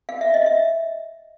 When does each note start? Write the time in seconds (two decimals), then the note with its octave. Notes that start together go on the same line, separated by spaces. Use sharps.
0.09 F5
0.21 E5
0.34 D#5
0.46 E5